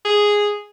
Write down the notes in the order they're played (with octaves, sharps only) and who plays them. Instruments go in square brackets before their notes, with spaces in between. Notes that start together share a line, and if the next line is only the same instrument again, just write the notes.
[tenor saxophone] G#4